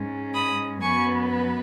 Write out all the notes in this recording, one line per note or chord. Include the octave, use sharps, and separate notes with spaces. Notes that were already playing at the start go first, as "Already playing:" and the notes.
Already playing: G#2 G#3 C#4
B5 D#6
F#2 F#3 B3 G#5 C#6
B4